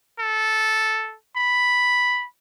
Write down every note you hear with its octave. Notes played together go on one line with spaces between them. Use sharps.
A4
B5